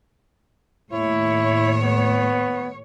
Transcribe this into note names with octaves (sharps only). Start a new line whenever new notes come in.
D#2 A2 E4 C#5
B3